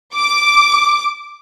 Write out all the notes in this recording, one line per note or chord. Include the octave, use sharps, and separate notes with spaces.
D6